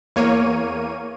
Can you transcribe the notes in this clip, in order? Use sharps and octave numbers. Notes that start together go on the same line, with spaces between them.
E2 A#3 C#5 D#7